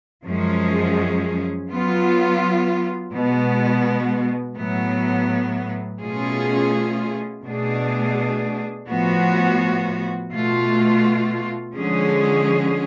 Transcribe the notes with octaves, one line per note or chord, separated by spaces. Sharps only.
F#2 F3 G#3 C#4 G#4
F#3 B3 F4
B2 G#3 B3
A2 F#3 B3
B2 A3 C#4 F4 G#4
B2 A3 D4 G#4
A2 F3 B3 F#4
B2 A3 F4
D3 F3 G#3 C#4 G#4